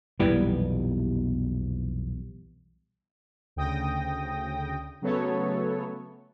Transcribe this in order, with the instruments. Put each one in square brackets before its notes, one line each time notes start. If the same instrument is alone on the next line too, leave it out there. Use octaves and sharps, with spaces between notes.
[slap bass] B1 F2 A#2 [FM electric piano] E3 G3 B3
[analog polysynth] D2 C#3 G5 D#6 A#6
C#3 F#3 A3 B3 A4 C#5